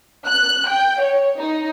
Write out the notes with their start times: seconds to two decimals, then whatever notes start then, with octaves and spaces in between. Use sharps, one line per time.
0.26 F#6
0.68 G5
1.00 C#5
1.38 D#4